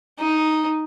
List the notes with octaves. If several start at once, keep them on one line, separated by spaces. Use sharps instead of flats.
D#4